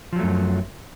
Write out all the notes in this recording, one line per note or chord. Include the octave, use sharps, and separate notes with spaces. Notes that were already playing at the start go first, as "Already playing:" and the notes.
F#2 F3 F#3 A3